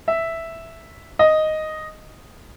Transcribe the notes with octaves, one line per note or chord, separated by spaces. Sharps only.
E5
D#5